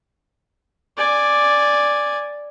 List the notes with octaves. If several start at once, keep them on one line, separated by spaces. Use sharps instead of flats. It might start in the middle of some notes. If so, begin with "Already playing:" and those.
D5 G#5